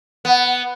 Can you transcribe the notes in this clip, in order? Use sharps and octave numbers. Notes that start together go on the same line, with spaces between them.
B3